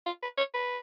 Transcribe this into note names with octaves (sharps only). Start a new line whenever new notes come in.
F4
B4
C#5
B4